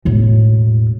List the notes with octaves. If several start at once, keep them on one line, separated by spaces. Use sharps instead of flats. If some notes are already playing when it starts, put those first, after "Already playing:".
E1 A2